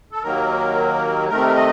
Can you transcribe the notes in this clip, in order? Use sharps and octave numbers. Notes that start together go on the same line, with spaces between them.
A4
D#2 D#3 F#3 A#3 A#4
C3 D#3 A3 A#4
D#5